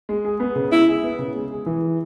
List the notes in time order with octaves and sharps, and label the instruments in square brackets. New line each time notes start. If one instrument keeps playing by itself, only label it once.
[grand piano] G#3
G#4
B3
C#3
[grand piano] G#3 [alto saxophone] E4
[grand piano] G#4
B3
C#3
G#3
G#4
E3